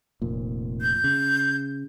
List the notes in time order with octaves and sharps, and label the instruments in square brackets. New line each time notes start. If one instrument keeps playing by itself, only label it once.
[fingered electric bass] F1 A#2
[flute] G6
[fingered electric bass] C#3